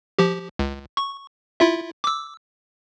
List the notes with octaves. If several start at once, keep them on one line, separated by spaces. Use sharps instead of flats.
F3 G4
C#2
C#6
E4 F4 E5
D6 E6